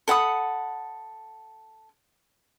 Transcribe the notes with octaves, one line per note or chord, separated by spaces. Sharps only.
A4 F#5 B5 D#6